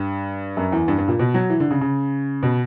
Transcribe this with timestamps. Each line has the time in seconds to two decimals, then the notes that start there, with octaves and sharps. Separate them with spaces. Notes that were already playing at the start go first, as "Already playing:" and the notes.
Already playing: G2
0.57 F#2
0.72 E2
0.88 G2
0.98 G2
1.08 A#2
1.20 B2
1.34 F#3
1.50 E3
1.60 D3
1.71 C#3
1.81 C#3
2.43 B2